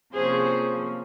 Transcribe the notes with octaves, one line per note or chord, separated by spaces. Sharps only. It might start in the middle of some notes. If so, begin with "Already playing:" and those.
C3 F3 A#3 C#4 G#4 C5